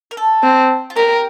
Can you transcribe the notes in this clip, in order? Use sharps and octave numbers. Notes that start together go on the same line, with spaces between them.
A#4
A4
C4
F4
G4 A#4